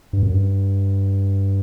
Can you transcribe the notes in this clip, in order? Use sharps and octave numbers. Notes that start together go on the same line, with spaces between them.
G2
F#2
G2